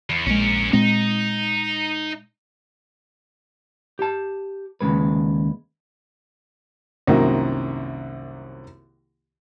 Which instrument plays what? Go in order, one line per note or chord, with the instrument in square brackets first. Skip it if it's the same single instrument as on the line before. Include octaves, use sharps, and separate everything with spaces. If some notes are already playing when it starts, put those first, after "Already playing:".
[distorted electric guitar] E2
[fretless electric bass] A#1 G#3 [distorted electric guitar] C#4 A#4
[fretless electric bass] A#2 G#3 C4 [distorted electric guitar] D#4
[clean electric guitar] G4 A5
D#2 G#2 C#3 G#3 B4
[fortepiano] C2 F#2 D#3 F#3 A#3